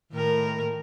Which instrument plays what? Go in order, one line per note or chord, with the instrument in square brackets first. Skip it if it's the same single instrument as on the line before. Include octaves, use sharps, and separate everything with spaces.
[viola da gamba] A2 A#4 [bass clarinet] D#3